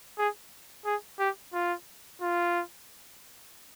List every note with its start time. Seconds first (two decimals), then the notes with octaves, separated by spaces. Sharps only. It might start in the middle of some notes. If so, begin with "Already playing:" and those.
0.18 G#4
0.85 G#4
1.19 G4
1.53 F4
2.22 F4